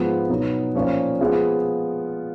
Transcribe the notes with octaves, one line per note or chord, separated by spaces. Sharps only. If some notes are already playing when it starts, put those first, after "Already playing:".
Already playing: G#2 F3 B3
B2 F#3 B3 D#4
A#2 F3 A#3 C#4 F4
F3 G#3 B3 F4 G#4